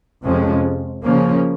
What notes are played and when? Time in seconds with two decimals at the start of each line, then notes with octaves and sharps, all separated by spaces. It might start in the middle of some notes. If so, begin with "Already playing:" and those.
0.23 F2 C3 F3 G#3 C#4
1.04 C#3 F3 A#3 C#4